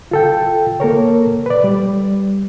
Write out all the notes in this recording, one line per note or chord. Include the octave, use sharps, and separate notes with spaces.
F4 A4 G5
A#3 A4 A#4 C#5
B4 D5
G3